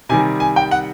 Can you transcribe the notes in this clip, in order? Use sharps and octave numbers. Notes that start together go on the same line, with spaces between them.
C3 D#3 G3 G#5
G#5
G5
F#5